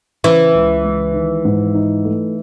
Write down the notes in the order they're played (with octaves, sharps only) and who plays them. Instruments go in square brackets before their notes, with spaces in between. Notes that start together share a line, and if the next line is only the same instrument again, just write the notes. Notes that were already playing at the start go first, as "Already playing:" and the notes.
[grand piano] C#3 [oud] E3
[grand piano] C#2
G#3
D#3
G#2
D#4
A3